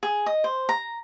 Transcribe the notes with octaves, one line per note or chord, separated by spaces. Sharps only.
G#4
D#5
C5
A#5